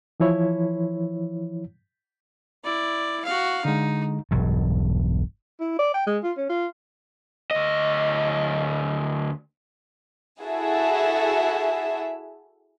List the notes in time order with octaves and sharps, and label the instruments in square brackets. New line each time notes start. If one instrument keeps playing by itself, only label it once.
[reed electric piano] E3 F3 E4 C#5
[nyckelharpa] E4 D5
F#4 F5
[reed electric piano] D3 G#3 [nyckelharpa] D#4
[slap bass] E1 B1 G2
[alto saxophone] E4
D5
G5
G#3
F4
C#4
F4
[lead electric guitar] D2 D#5
[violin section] E4 F#4 G#4 A4 E5